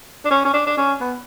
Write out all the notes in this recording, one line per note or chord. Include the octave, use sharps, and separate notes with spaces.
D4
C#4
C#4
D4
D4
C#4
B3